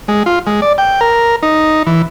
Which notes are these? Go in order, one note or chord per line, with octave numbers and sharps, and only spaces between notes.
G#3
F4
G#3
D5
G5
A#4
D#4
E3